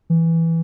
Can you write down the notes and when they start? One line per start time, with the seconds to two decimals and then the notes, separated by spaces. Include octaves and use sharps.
0.10 E3